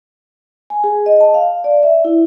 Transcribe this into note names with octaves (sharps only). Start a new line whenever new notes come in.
G#5
G#4
D#5
A5
F5
D5
E5
E4